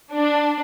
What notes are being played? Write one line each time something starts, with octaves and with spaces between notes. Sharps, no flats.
D4